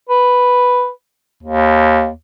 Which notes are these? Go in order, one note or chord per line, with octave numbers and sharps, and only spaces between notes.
B4
D#2